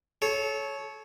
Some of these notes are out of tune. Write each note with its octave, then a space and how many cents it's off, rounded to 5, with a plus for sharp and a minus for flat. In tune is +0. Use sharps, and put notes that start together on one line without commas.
A4 -30 C#5 +0